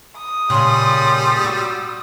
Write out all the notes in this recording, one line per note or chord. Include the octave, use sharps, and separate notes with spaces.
D#6
A#2 C#3 G3 C6
F#4 E6